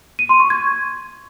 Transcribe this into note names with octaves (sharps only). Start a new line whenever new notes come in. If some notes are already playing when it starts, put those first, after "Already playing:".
D#7
C6
C#6
G#6